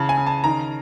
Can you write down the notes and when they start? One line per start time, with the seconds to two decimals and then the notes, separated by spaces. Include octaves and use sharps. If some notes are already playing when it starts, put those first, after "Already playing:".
Already playing: C#3 E3 A5
0.09 G#5
0.18 C#3
0.27 A5
0.44 D#3 A#5